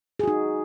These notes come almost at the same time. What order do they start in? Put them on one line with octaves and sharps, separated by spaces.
G#4 F#4 D#4